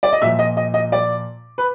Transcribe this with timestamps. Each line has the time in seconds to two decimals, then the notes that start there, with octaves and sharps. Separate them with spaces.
0.03 D5
0.13 D#5
0.22 A#2 F3 E5
0.39 D#5
0.57 D#5
0.74 D#5
0.92 D5
1.58 B4